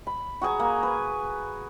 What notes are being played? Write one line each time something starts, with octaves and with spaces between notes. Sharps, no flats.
B5
F#4 G#4 G#5 A#5
A#3
B4